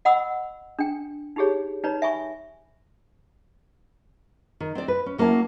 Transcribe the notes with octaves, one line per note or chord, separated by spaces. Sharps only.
D#5 F#5 B5 E6
D4 G5
D#4 E4 G4 G#4 C#5
D#4 B4 C#5 D5 A#5
E5 G#5 B5 C#6
D#3
C4 D5
B4
C#4
F#3 A#3 C#4 E4 A5